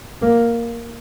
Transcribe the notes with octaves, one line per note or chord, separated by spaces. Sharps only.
A#3